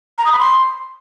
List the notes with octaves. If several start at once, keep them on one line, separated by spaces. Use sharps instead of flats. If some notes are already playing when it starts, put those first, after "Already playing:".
A#5
D#6
B5
C6